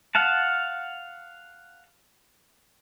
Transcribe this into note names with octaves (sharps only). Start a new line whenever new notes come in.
F5 F#5 A5